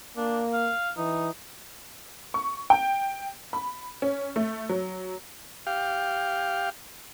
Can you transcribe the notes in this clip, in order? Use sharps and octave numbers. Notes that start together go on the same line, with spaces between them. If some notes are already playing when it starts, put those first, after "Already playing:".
A#3 D4
F5
E3 D#4
C#6
G5
B5
C#4
A3
F#3
G4 F5